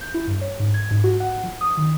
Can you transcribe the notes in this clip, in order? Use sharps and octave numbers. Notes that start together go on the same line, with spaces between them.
G6
E4
G2
C#5
G#2
G#6
G#2
F#4
F#5
F3
D#6
D#3